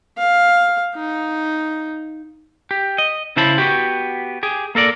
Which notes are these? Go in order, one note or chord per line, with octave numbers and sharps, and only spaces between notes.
F5
D#4
G4
D#5
C#3 E4 C5 A5 B5
B3 F#4 G4
G4 G#4
A#3 A4 A#4 D5